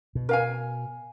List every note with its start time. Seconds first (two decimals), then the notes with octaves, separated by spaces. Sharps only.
0.15 B2
0.29 A#4 F5 G#5